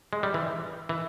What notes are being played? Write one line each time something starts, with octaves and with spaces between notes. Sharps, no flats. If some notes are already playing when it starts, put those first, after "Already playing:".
G#3
G3
E3
E3